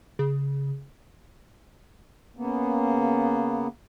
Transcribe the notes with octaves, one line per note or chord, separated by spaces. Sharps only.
C#3
C#3 A#3 B3